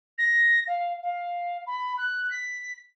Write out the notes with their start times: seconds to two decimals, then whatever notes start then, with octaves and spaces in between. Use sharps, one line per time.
0.18 A#6
0.67 F5
1.02 F5
1.66 B5
1.97 F#6
2.30 B6